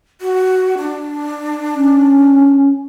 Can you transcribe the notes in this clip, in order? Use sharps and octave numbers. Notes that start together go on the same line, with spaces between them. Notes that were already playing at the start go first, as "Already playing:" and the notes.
F#4
D4
C#4